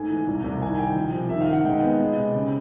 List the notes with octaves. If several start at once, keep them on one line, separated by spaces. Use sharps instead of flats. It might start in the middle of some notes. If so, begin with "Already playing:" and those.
Already playing: G#2 A3 G#5
E3
C2
C2
D#3 G#5
D#3 G5
F3
C3
D#3 E5
F5
D#3 F#5
G#3 G5
B3
G#3
C3
C#3